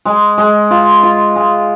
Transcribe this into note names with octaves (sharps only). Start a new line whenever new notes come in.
G#3
G#3
F4
F4
G#3